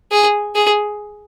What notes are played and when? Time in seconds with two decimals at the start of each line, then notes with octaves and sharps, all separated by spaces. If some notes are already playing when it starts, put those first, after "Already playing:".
0.12 G#4
0.55 G#4